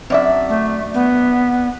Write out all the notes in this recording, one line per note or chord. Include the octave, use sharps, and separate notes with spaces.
F#2 C4 D4 D5 E5
A3
B3